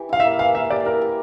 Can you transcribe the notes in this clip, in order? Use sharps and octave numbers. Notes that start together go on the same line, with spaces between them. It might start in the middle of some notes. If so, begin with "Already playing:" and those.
Already playing: E3 G4
E4 F5
E5
A#3
E3 F5
A#3 E5
G4 D5
E4 A#4
G4